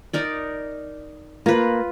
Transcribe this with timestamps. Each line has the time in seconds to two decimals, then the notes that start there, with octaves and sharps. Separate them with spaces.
0.13 D#4 A#4 D5
1.46 A#3 F4 B4